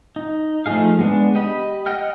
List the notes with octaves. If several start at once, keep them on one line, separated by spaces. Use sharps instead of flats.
D#4
F3 A3 D#4 G#4 F5
G#3 B3 D4
G4 D#5 B5
D#5 F#5 G5 F6